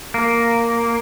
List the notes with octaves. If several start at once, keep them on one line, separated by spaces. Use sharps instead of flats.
A#3